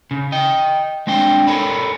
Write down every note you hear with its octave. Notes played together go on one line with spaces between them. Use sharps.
C#3
D#5 G5
G#3 C4 D4 G5
A4 A#4 C#5 G#5 A5 B5